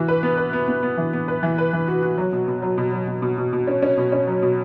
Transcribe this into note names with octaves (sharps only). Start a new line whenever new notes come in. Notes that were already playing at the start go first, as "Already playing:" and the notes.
Already playing: E3 F#4
B4
B3
B4
B3
B3
B3
E3
B3
B4
E3
B4
E3
F#4
F#4
F#3
B2
B2
F#3
B2
F#3
B2
B2
B2
B2
C#4
C#4
B2
C#4
F#3
B2